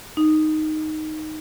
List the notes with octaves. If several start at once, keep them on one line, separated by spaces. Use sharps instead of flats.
D#4